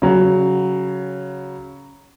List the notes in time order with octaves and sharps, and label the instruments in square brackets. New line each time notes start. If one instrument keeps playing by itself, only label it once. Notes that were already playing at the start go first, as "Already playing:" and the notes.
[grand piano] C#3 F#3